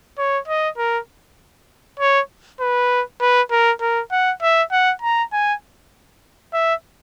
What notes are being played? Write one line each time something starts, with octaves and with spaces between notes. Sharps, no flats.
C#5
D#5
A#4
C#5
B4
B4
A#4
A#4
F#5
E5
F#5
A#5
G#5
E5